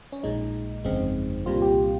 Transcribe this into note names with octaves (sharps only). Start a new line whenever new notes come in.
C#4
A#1 A#2 G#3 D#4
G1 F2 C#3 G#3 C4
C2 A#2 G3 C4 F4
G4